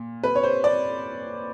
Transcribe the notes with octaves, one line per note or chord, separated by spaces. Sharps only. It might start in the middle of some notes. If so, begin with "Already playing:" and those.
Already playing: A#2
B4
C#5
C5
D5